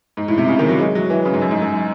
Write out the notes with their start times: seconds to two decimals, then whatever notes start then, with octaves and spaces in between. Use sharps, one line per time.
0.17 G#2
0.28 A2
0.38 C3
0.48 C#3
0.59 D#3
0.68 F#3
0.80 G#3
0.95 F#3
1.10 E3
1.25 C#3
1.34 G#2
1.41 F#2
1.51 G#2
1.62 F#2